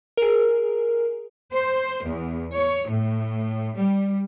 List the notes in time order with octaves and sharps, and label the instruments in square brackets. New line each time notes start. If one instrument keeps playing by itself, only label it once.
[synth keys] G#4 A#4
[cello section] C5
E2
C#5
A2
G3